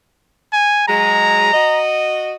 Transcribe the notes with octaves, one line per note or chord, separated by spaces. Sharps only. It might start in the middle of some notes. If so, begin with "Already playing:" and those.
G#5
F#3 G#3 A#5
F#4 D#5